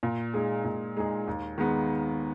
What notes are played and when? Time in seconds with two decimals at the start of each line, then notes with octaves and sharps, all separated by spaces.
0.03 A#2
0.34 G#3 D#4 G#4
0.64 A#2
0.97 G#3 D#4 G#4
1.27 D#2
1.58 D#3 G#3 B3